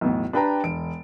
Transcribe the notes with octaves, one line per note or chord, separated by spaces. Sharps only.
B1 E2 A2
D4 G4 B4 G5 A5 A#5
E1 D7